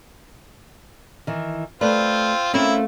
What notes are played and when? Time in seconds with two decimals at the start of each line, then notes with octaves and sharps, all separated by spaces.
1.27 D#3 E3
1.81 A3 C4 F4 B4 D5
2.54 A3 C4 C#4 E4 F4 A#4